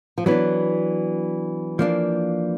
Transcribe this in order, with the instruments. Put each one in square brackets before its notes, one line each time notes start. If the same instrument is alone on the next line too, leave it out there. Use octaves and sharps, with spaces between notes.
[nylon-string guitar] F3
[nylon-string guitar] E3 [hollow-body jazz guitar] F#3 B3 D4
[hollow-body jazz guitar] F3 A#3 D4